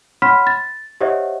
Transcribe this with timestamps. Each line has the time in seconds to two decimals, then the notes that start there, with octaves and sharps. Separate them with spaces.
0.22 C#5 F#5 B5 C6 F6 B6
0.47 A6
1.01 G4 C5 C#5 D#5 E5 F#5